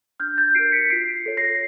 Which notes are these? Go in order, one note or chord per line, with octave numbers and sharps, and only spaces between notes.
D4 F6 G6
G6 A6
F#4 A#4 C7 D7
B6 C#7
F4 C7 D7
A4 C#5
A#6 C7